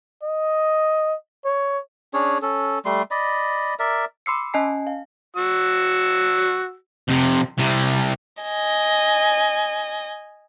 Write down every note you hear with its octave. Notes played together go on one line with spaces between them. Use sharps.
D#5
C#5
C#4 D4 G#4 C#5
C#4 A4
G3 A3 C6
D5 D#5 B5
A#4 D5 E5
B5 C6 D6 E6 C7 C#7
C#4 D#5 G#5 A5 C7
F5
F#4 E6
F2 C3
C2 C3
D#5 G#5